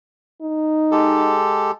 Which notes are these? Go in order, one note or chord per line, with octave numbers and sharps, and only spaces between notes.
D#4
G#3 G4 A4